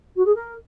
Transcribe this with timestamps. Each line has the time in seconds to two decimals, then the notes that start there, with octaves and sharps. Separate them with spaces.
0.16 F#4
0.25 G#4
0.35 A#4